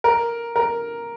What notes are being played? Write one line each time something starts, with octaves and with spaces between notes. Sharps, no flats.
A#4
A#4